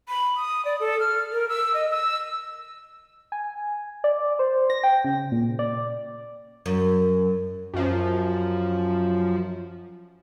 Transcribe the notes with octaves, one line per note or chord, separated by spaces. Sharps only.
B5
D#6
D5
A4
F6
A#4
E6
D#5
E6
G#5
D5
C5
A#6
G5
C#3
A#2
D5
F#2
F#2 F3